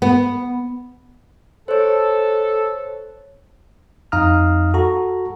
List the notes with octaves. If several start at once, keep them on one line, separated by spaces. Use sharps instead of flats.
B3
A4 C5 C#5
F2 D#4 F5 A#5 D#6 F6
F#4 A4 A#5